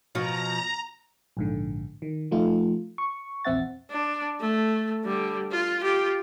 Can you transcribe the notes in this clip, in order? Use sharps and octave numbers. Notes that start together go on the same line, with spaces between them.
B2 F3 F#4 A#5
A#1 G#2 D3
D#3
F3 A3 D#4 F4
C#6
A#1 E2 C4 E5 F#5 A6
D4
A3
D3 G3
F4
F4 G4